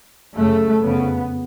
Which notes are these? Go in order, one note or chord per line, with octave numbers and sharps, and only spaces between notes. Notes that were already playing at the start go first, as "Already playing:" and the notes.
F#2 C#3 A3
F2 C#3 B3